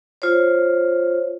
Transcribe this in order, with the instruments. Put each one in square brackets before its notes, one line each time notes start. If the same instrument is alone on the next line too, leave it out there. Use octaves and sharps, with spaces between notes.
[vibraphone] F4 C5 C#5